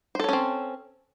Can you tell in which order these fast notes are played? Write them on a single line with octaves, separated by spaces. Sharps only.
C5 A4 C#5 C#4 C4